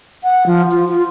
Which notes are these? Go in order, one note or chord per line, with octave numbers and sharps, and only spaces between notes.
F#5
F3
F4
F4